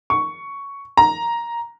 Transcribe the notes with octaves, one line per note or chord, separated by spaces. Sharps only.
C#6
A#5